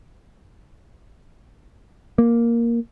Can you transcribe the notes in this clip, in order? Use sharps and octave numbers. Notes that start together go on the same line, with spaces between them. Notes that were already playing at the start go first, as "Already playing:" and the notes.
A#3